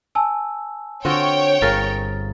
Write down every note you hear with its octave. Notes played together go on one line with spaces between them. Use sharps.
G#5 A5 E6
D3 C4 F4 F#4 C#5 G5
G1 G#4 A#4 F5 A6